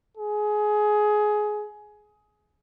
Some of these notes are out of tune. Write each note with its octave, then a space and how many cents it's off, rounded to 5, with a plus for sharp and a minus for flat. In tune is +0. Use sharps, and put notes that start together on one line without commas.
G#4 +20